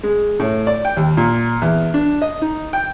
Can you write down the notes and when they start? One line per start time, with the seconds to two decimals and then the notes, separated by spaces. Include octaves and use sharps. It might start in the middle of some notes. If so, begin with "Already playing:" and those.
0.03 G#3
0.40 A2
0.67 D5
0.85 G5
0.97 D#2
1.17 A#2
1.62 E2
1.94 D4
2.22 D#5
2.42 D#4
2.73 G5